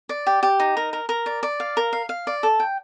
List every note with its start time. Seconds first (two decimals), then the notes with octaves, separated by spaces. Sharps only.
0.09 D5
0.27 G4
0.43 G4
0.60 D#4
0.77 A#4
0.93 A#4
1.09 A#4
1.26 D5
1.43 D5
1.60 F5
1.77 A#4
1.93 F5
2.09 F5
2.27 D5
2.43 A4
2.60 G5